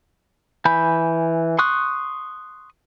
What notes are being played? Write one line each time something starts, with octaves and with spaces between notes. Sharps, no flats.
E3 G#5 B5 G6
C6 C#6 D#6 F#6